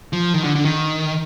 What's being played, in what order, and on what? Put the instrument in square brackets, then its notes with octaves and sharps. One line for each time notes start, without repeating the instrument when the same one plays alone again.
[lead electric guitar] F3
D#3
D3
D3
D#3